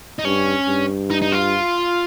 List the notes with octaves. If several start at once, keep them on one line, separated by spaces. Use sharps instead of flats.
D#4
G2 C#4
G2
D#4
D#4
F4